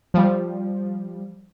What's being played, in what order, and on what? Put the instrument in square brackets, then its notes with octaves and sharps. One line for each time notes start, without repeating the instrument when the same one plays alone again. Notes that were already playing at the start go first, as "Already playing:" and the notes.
[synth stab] F3 G3